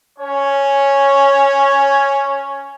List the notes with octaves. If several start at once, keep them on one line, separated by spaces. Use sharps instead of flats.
C#4 C#5